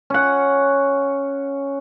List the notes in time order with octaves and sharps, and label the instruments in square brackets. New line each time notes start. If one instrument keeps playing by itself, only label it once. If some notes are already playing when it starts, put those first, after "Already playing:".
[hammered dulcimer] C#4 F#5